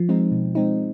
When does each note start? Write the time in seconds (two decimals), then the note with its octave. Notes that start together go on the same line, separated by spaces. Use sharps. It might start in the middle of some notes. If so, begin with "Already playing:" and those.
Already playing: F3
0.09 G#3 C4 D#4
0.32 B2
0.55 G#3 C4 D#4